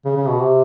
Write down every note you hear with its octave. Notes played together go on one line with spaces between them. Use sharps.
C#3
C#3
B2
C3